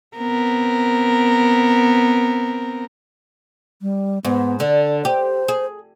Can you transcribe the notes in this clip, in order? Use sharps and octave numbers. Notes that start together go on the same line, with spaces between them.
B3 C4 A#4
G3
G#2 B3
D3 D5
G4 C5
G#4